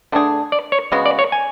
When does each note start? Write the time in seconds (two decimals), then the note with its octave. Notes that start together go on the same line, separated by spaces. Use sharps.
0.12 D3 A3 D4 G#4
0.52 D5
0.72 C#5
0.92 C#3 G#3 B3 F#4
1.06 D5
1.19 C#5
1.32 G#5